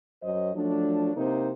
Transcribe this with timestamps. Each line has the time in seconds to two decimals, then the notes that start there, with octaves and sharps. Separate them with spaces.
0.23 F#2 F#3 C5 D#5
0.54 F3 F#3 A3 D4
1.15 C3 A#3 C4 D#4 C5